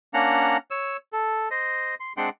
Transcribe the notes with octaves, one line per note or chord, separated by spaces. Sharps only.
A#3 C#4 D4 F#5 A#5
C#5 E6
A4
C5 D#5
C6
G#3 C4 D4 F#5 G5 C6